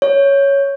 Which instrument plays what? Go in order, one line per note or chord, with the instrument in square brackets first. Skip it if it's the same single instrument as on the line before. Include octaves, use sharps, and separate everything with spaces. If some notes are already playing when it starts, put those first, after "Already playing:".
[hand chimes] C#5